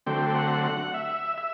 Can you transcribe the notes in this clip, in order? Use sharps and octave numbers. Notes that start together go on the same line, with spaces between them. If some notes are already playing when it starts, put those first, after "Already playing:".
D3 F#3 A3 C4 G5
F#5
F#5
E5
E5